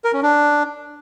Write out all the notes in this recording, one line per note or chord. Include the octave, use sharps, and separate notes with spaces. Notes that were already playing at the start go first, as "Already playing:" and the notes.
A#4
C#4
D4